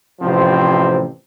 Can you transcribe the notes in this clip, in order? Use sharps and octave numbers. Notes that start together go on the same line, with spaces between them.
A1 C3 F3 C4